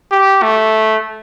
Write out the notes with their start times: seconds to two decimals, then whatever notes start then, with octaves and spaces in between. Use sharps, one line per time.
0.12 G4
0.42 A3